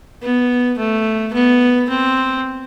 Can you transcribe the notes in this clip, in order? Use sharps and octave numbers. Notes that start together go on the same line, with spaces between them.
B3
A3
B3
C4